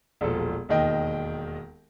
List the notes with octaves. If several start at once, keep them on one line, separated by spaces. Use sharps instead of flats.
E1 A#1 F3 A4
E1 D#2 D#3 D#5 G5